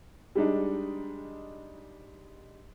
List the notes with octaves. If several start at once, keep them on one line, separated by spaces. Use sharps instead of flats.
G3 G#3 D4 D#4